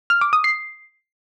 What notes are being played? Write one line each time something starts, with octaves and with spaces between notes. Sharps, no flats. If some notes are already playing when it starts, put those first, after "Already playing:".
F6
D6
D#6
C7